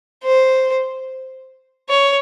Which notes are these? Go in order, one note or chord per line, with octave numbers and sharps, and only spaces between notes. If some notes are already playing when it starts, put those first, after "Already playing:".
C5
C#5